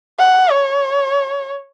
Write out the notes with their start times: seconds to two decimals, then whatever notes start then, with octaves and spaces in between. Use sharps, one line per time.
0.19 F#5
0.51 C#5